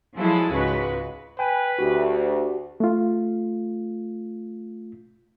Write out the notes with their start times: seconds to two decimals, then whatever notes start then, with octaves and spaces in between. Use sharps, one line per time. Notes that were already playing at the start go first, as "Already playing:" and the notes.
0.17 F3 F#3 G#3 E4 G#4 A4
0.52 C#2 G#2 G#3 F#4 B4
1.39 B4 G5 G#5
1.79 D2 F#4 G4
2.80 A3 F4